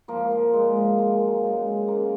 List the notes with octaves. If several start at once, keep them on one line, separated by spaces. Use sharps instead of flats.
F3 A#3
F3
A#2 G#3
F3
F#3 A#3
F#3
C#3 G#3
C#3
F#3 A#3